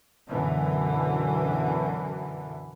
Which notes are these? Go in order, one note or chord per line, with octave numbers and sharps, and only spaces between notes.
F#2 B2 D3 E3